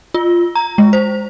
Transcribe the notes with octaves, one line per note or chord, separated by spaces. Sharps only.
F4
A#5
G#3
C5